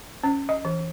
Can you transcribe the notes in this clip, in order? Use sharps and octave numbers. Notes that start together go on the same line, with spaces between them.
C#4
D#5
E3